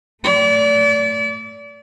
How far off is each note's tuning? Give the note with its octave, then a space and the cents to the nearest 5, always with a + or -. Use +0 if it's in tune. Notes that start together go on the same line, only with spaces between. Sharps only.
A3 +20 D5 -35